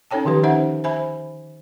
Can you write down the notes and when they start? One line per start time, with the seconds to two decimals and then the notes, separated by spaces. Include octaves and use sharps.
0.11 C#4 D#4 A4 C#5 G5 A5
0.25 D3 D#3 F3 G4 B4
0.43 C#4 D#4 C5 E5 F#5
0.84 C5 E5 G#5 B5